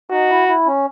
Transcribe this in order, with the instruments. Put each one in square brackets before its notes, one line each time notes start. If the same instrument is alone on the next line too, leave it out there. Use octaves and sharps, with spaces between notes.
[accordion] D#4 [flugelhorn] F#4
[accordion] E4
E4
C#4